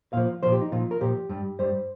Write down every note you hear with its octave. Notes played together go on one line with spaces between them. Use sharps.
A#2 F3 F5
A#2 F3 C5
G4
D#4
A#2 F3 F4
A#4
A#2 F3 G4
G2 G3
G2 G3 C5